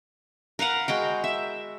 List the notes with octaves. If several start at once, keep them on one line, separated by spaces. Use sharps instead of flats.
A#4 B4 F5 F#5
G#3 F#4 G5
E5